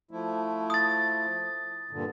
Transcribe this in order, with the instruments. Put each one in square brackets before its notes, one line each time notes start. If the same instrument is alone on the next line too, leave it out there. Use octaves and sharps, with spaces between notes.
[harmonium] F3 A3 E4
[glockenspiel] D#6 A6
[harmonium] G2 A#2 D3